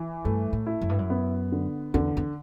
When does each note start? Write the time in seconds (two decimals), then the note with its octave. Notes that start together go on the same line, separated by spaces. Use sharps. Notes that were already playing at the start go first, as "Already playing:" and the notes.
Already playing: E3
0.25 G2 A3
0.53 A2
0.67 E4
0.81 F#2
0.89 G2
0.99 F#2
1.10 B3
1.52 D3
1.94 E2 D3
2.17 E2